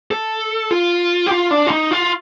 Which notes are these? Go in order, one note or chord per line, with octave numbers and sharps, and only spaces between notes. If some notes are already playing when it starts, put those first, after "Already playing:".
A4
F4
G4
F4
D4
F4
D#4
F4